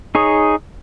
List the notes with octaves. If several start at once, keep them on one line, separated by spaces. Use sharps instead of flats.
D#4 G#4 C#5